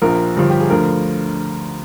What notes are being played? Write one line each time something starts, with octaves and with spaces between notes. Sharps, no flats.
A#1 A#2 F3 A#4
G1 G2 F3
G4
G#4
D2 D3 F3 A#4